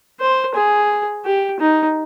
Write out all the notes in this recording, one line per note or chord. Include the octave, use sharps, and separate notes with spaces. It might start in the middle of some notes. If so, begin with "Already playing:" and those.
C5
G#4
G4
D#4